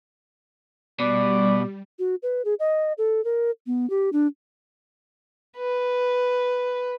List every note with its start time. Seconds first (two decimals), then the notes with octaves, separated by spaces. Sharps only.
1.00 B2 G3 D5
1.99 F#4
2.23 B4
2.45 G#4
2.60 D#5
2.98 A4
3.25 A#4
3.67 B3
3.90 G4
4.13 D4
5.58 B4